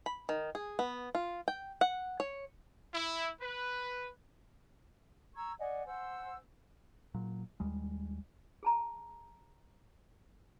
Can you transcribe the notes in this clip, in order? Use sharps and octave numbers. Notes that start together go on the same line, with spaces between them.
B5
D#3
G#4
B3
F4
G5
F#5
C#5
E4
B4
A#5 C#6 E6 G#6
D5 D#5 F#5 G#5
C5 F#5 G#5 E6
A#2 F#3
D#2 G3 G#3
G#4 A5 A#5